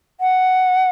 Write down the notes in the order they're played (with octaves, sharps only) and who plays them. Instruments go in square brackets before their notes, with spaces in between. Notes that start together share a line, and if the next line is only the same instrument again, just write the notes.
[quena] F#5